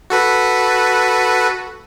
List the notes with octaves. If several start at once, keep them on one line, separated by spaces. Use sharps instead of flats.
F#4 A4 B4